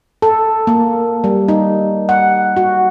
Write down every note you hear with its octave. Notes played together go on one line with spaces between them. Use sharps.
A4
A#3
G3
D#4
F#5
F#4